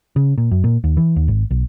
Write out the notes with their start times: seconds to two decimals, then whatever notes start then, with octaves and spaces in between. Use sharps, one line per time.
0.16 C#3
0.38 A#2
0.51 F#2
0.64 A#2
0.84 D#2
0.97 E3
1.16 D#2
1.28 G#1
1.51 B1